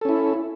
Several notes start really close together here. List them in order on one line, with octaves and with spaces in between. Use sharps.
A4 C#4 E4